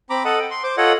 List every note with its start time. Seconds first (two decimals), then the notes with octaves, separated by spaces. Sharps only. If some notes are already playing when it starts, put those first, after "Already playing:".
0.10 C4 A#5 B5 D6
0.25 A4 D#5 F#5 A5 D#6
0.39 G5
0.51 C6
0.64 C5 D6
0.77 F4 A4 C#5 D#5 F#5